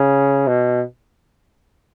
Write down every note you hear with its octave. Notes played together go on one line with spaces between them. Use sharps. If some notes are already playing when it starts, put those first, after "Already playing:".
Already playing: C#3
B2